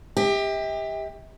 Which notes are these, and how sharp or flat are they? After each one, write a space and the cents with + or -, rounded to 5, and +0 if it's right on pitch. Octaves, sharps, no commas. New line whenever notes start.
G4 +25 E5 -40